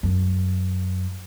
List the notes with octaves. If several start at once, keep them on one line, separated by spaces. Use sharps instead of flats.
F#2